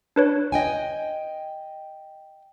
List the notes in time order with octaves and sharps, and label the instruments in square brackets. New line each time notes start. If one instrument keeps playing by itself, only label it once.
[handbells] D4 B4 C#5
[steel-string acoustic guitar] D#5 G5 G#5